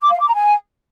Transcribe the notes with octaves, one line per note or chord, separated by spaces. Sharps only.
D6
F5
D6
A#5
G#5